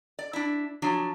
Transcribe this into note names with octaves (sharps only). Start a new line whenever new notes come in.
D5
D4 E4
F3 F#3 D4